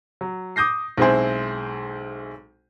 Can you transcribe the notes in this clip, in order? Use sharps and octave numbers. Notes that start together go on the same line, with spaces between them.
F#3
D6 D#6 G6 A#6 C7
B1 G#3 C4 E4 G#4 C5